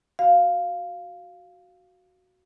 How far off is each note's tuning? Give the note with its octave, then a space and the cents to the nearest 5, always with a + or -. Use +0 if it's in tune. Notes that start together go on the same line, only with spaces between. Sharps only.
F#4 +0 F5 +0